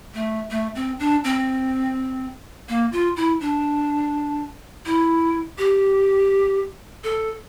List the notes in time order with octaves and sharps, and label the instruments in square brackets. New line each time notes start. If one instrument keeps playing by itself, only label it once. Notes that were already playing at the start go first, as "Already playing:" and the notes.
[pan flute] A3
A3
C4
D4
C4
A#3
F4
E4
D4
E4
G4
A4